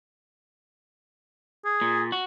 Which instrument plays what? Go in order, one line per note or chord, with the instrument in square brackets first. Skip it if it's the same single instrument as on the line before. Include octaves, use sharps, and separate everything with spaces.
[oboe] G#4
[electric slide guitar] A#2
F#4